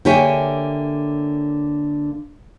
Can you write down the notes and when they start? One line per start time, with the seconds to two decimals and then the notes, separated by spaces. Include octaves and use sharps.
0.05 D3 A#3 G4 C#5 E5 G#5